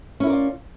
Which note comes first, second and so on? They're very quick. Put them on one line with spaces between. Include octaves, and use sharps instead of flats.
C#4 E4 A#4 D5 F4